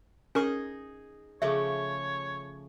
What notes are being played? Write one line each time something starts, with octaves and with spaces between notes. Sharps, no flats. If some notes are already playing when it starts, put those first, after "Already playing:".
C#4 D#4 G#4 A#4 D#5 C#6
C#3 F3 A3 G#4 C#5 E5